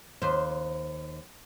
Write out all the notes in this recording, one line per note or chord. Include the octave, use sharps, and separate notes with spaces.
D#2 C5